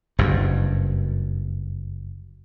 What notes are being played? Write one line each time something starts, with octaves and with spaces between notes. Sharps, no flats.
F#1 G2